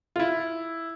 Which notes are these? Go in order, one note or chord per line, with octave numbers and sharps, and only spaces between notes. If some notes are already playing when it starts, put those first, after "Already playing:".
F4
E4